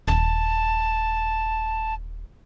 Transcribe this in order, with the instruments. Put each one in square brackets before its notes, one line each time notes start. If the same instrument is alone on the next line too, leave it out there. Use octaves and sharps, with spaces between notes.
[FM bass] D#1 [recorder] A5